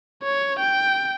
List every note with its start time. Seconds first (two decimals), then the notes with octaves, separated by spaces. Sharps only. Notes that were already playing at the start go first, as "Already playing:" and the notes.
0.23 C#5
0.60 G5